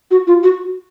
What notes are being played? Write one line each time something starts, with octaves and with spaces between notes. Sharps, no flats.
F#4
F4
F#4